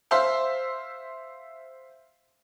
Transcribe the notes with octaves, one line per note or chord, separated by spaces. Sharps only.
C5 E5 F5 C6